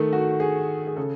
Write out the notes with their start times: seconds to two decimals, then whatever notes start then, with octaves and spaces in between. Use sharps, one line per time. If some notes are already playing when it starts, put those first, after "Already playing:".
Already playing: D#3 A3
0.13 F#4
0.40 G#4
0.87 G#4
0.97 C#3 A4